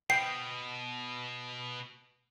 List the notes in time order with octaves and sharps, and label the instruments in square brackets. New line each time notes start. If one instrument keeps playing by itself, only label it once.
[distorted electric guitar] B2 [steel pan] G5 [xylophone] C7